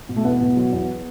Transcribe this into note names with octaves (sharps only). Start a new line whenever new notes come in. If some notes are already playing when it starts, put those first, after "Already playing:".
B2
A3
E2 B3
B2
F#3
E2